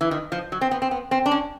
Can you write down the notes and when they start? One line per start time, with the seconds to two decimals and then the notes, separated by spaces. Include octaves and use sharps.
0.01 E3
0.11 D#3
0.32 F3
0.52 F#3
0.61 C4
0.71 B3
0.82 C4
0.91 B3
1.11 C4
1.26 D4
1.31 C#4